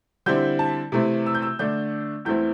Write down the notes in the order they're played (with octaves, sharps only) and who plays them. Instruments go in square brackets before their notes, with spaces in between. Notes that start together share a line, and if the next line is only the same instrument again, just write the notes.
[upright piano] D3 G3 C4 E4 G6
A5
C3 E3 A3 C4 E4
E6
G6
E6
D3 A3 D4 G6
E2 E3 A3 C4 E4 G6